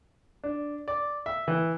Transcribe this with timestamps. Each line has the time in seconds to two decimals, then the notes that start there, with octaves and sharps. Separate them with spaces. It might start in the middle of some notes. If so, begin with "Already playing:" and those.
0.44 D4
0.88 D5
1.26 E5
1.48 E3